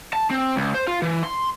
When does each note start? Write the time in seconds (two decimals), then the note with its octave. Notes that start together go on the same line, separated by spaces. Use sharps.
0.13 A5
0.31 C4
0.56 C#2
0.74 C5
0.88 F4
1.02 E3
1.23 C6